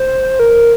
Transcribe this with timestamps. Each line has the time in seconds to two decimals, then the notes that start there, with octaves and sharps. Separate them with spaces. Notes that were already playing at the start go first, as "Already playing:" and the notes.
Already playing: C5
0.40 A#4